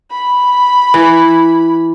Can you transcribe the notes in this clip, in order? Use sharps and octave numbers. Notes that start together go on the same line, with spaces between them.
B5
E3